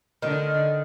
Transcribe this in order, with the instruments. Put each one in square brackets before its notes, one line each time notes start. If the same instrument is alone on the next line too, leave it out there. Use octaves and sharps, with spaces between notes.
[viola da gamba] D3 [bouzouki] D#3